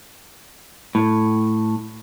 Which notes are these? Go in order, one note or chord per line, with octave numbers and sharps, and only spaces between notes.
A2